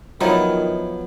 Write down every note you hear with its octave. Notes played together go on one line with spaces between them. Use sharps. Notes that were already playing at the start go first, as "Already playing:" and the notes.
D#3 F3 F#3 B3 D#4 E4